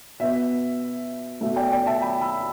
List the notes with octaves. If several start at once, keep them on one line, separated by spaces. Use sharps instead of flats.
B2 B3 E5
B2 A3 E5
D5 G5
D5 G5
E5 A5
G5 B5
B5 E6